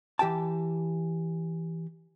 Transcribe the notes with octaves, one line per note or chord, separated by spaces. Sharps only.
E3 G4 G5 A5